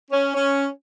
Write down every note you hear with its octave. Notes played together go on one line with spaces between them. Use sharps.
C#4
C#4